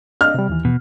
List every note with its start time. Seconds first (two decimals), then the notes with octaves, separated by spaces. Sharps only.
0.21 D4 D#5 F6
0.34 C3 G3
0.49 D#2 E3
0.65 B2